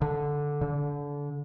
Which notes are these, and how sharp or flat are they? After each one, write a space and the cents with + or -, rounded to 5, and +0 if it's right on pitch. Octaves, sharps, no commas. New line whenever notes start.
D3 -5
D3 -25